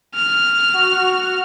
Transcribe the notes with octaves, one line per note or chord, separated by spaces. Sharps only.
F6
F#4